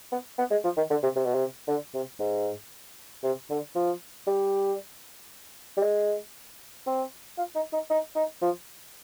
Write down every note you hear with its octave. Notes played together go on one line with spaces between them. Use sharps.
B3
B3
G#3
F3
D#3
D3
C3
C3
B2
C3
D3
C3
G#2
C3
D3
F3
G3
G3
G#3
C4
F4
D#4
D#4
D#4
D#4
F3